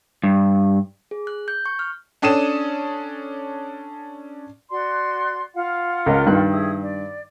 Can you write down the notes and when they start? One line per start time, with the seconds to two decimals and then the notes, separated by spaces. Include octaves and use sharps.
0.24 G2
1.11 G#4
1.27 F#6
1.48 G6
1.66 C#6
1.79 F6
2.22 C#4 D4 A4 D#6 D#7 E7
4.71 F#4 D5 C6
5.54 F4 F5 F#5
6.06 C#2 A#4
6.26 G2 D#3 F#6
6.51 E4 G#4 D#6
6.81 D5